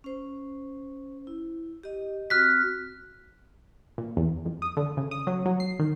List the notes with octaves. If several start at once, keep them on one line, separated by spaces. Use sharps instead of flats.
C#4 C5
E4
G4 D#5
C4 F#4 F6 F#6 B6
A#2
E2
F2
D#6
D3
C#3
D#6
F#3
F#3
C7
D#3